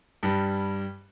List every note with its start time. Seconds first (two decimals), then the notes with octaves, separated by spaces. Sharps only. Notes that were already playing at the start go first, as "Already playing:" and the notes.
0.23 G2 G3